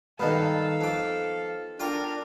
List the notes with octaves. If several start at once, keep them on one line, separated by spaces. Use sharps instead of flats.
G2 D#3 B3 D#4 A4 F5
F2 D6
D4 F4 A#4 G5 A#5